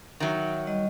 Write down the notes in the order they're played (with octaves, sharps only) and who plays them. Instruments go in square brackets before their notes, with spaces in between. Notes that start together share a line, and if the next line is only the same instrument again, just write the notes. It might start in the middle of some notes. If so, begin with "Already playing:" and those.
[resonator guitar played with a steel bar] D#3 F#3 [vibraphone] E5
[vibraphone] G3 D#5